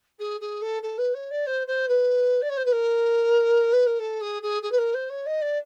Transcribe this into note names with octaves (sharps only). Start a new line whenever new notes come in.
G#4
G#4
A4
A4
B4
C#5
D5
C5
C5
B4
D5
C#5
C5
B4
A#4
B4
A#4
A4
G#4
G#4
G#4
B4
A#4
C5
C#5
D#5
D5